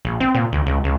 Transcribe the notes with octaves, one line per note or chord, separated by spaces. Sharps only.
A#1
C4
A#2
D2
C#2
C#2